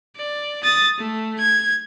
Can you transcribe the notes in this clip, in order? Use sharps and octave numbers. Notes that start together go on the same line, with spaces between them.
D5
D#6 A6
A3
G#6